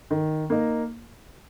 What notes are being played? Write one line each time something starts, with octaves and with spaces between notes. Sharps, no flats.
D#3
A#3 D#4